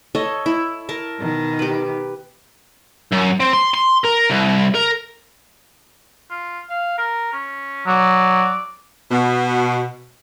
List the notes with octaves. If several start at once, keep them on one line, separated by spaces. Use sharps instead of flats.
A4 C#5 D#5
E4
A#4 A5
B2 D#3
G4 B4
F#2
C4
C6
C6
A#4
C2
A#4
F4
F5
A#4
C#4
F#3 D5
B2